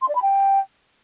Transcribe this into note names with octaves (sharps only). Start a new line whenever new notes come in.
C6
D5
B5
G5